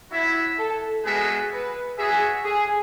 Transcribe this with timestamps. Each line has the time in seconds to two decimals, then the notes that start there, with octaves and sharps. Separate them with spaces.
0.11 E4 F#4 C#5 E5
0.58 A4
1.05 G#3 B3 F#4 G#4 B4 E5
1.52 B4
1.98 F#4 G#4 C#5 E5
2.45 G#4